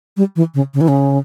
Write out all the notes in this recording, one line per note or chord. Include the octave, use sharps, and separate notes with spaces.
G3
E3
C#3
C#3
E3
C#3